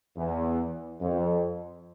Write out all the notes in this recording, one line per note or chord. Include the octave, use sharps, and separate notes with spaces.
E2
F2